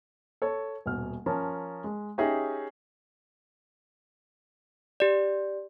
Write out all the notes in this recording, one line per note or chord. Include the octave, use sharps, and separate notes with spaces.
A4 C#5
D#1 B2 F6
F3 C#4 A#4 A5
G#3
C#4 D#4 G4 G#4 E5
G4 D5